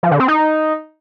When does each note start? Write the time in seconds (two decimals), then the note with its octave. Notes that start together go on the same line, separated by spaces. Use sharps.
0.03 F3
0.11 D3
0.20 C4
0.28 D#4